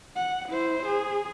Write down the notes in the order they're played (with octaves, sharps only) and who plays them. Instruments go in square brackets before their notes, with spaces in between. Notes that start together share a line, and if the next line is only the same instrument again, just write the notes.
[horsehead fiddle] F#5
E4 C5
G#4